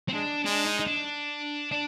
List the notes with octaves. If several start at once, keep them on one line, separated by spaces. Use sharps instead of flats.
C4
G#3 D4
G#3 D4
D#4
D#4
D4
D4